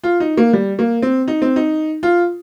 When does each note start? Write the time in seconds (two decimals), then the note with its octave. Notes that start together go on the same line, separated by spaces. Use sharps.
0.04 F4
0.20 D#4
0.37 A#3
0.53 G3
0.79 A#3
1.02 C4
1.28 D#4
1.42 C4
1.56 D#4
2.03 F4